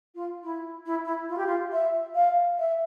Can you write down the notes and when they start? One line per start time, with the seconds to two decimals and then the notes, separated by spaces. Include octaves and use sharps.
0.14 F4
0.43 E4
0.85 E4
1.04 E4
1.29 F4
1.37 G4
1.46 F4
1.72 E5
2.15 F5
2.58 E5